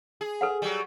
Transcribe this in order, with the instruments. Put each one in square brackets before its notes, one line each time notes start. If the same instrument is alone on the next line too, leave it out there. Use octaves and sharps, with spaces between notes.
[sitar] G#4
[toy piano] A4 B4 F#5
[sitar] F#3 G3